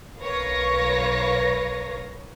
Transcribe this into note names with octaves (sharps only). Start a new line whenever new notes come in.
B1 A#4 B4 C#5 F5 A#6